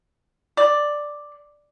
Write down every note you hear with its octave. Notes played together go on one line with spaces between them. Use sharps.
D5